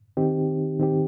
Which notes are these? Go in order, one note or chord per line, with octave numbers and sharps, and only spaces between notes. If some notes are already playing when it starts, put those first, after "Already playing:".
D#3 C4 D#4 G4
D#3 C4 D#4 G4